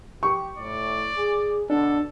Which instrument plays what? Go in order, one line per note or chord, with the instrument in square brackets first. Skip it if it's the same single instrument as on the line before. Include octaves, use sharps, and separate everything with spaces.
[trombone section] G4 [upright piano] C#6
[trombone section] A2 [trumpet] D5
[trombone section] G#4
[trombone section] B2 D3 [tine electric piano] D4 [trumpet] A4